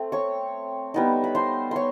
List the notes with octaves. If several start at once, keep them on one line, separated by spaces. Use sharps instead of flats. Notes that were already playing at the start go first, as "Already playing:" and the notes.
Already playing: A3 C4
C#5 C#6
G3 B3 D#4
B5
C5 C6
C#5 C6 C#6